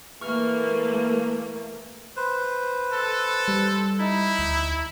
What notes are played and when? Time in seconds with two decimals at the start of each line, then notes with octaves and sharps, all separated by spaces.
0.21 E3 A3 A#3 C#6 F6
2.16 B4 C5
2.92 A4
3.48 G3
4.00 D#4 E4
4.39 D2